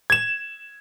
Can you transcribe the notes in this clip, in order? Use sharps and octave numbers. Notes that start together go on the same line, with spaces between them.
G#6 E7